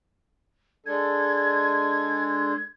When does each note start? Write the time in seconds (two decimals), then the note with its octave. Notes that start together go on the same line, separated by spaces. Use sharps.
0.86 G#3 D4 A4 G#6